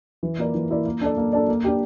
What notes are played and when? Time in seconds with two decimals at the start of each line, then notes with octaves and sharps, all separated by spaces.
0.23 E3
0.39 A#3 E4 A#4 D5
0.55 E3
0.70 A#3 E4 A#4 D5
0.86 A#3
1.01 D4 A4 D5
1.17 A#3
1.33 D4 A4 D5
1.49 A#3
1.64 D4 G4